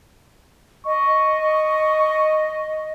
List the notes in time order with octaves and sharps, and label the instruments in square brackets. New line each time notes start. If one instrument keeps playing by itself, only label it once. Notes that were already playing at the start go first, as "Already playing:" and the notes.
[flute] D#5 [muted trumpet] C#6